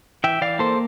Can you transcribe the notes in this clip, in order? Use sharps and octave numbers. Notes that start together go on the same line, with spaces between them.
E3 E5 G5
E3 D5 F5
A#3 A4 C5